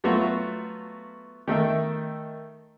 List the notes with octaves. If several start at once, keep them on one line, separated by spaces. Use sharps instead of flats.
F#3 A3 B3 F4 F#4
D#3 A3 E5